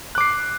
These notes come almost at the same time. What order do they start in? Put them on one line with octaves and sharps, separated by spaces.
F#6 D6 C7